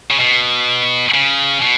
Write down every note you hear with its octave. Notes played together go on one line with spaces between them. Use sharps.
C#3
B2
C#3
B2